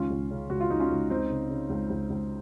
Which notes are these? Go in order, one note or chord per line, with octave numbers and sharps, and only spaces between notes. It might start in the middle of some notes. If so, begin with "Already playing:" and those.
Already playing: C#2 D#3 C#4 F4
C#2
C#3
C#2 F#4
F4
C#2 D#4
C#4 F4
C#2
C#2 C4 D#4
C#3
C#3
C#2
C#2
C#2